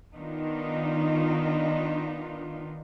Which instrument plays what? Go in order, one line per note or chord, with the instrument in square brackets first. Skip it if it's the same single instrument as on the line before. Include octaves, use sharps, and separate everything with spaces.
[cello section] D#3 B3 D4 D#4 F4